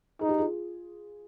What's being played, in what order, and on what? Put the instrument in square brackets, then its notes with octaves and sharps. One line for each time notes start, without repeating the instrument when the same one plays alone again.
[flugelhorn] D#4 [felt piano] G#4
[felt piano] G4
F4 G#4